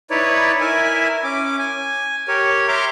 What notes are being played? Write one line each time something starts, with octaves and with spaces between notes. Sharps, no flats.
D#4 E4 B4 C#5 D5
E4 A#4 E5 G#5
C#4 D6
G#5
G4 A#4 C#5
E5 A#5 C6 D6 F6